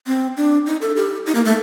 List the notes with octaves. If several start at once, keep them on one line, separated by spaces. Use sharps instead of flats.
C4
D4
D#4
A4
G4
D#4
A#3
A3